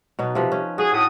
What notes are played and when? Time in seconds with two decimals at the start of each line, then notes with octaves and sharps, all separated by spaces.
0.19 B2 F#3 D#4
0.35 C3 F3 B4
0.52 C#4
0.78 F#4 G#4
0.93 A2 D#6